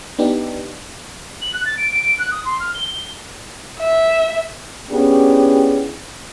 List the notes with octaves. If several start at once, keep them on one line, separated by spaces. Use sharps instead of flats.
B3 D4 D#4 G4
F#7
F#6
A6
D7
D7
D7
F#6
D#6
C6
F6
G7
G7
E5
B3 C#4 D4 E4 G4 G#4